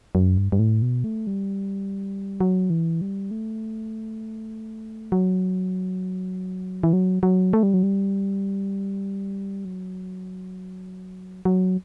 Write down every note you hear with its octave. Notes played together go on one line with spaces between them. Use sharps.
F#2
G2
G2
A2
B2
A3
G3
F#3
E3
G3
A3
F#3
E3
F#3
F#3
A3
G3
F#3
G3
F#3
F#3